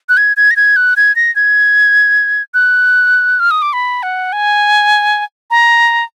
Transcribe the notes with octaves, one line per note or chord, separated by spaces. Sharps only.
F#6
G#6
G#6
A#6
G#6
F#6
G#6
A#6
G#6
F#6
F6
D#6
D6
B5
F#5
G#5
A#5